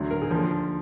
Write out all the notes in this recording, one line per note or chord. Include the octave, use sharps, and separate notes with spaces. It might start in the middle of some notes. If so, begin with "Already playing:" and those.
Already playing: D2 D3 F#3
A#4
G#4
D#2 D3 F3 A#4